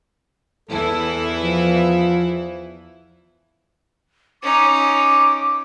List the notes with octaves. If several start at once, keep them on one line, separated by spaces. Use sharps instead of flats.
E2 E3 E4 A4
F3
C#4 D#4 D6